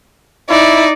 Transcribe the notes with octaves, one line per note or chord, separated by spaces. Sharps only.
D#4 E4 D5